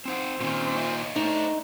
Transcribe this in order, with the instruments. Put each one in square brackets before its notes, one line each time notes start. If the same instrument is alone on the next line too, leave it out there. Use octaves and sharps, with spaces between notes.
[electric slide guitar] C4 D#4 F#5 [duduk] C5
[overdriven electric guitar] A#2 D#3 [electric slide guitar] C4 C#4
[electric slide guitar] C#5 D#5 E5
[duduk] A3 [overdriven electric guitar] D4 C5 [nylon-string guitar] D#4